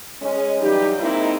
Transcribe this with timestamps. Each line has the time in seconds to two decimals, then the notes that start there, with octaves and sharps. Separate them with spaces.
0.21 G#3 C#4
0.61 E3 F#3 G3 D#4 G4
0.99 G#3 A#3 C4 D#4 E4